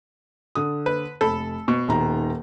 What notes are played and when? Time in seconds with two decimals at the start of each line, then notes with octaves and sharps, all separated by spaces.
0.55 D3 D#6
0.86 B4
1.21 F1 A4 B5
1.68 B2 C#6
1.88 D#1 D#3 A#5